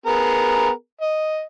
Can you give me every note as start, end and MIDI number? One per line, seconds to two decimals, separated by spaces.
0.06 0.69 59
0.06 0.69 68
0.06 0.69 70
1.01 1.42 75